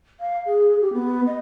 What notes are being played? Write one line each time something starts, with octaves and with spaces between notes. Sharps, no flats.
F5
G#4
G4
B3
D#5